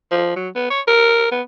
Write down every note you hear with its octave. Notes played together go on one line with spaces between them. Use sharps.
F3
F#3
B3
C#5
A#4
B3